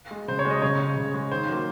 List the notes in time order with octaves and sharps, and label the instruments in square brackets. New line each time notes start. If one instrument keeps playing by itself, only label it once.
[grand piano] G#3
C#3 C5
C#5
G#3
D#5
C#3 C#5
G#3
C#3
G#3
D#3 C5
F#3 A#3